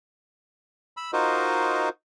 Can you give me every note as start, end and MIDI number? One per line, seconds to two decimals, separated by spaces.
0.97 1.11 83
0.97 1.11 88
1.13 1.89 63
1.13 1.89 65
1.13 1.89 66
1.13 1.89 70
1.13 1.89 72
1.13 1.89 75